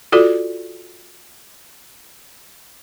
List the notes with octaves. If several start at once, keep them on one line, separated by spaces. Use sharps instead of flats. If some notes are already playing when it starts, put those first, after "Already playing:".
F4 F#4 A4 D5